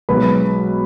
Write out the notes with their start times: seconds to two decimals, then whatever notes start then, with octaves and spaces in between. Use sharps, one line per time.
0.09 B1 B2 G#3 B3 B4 B5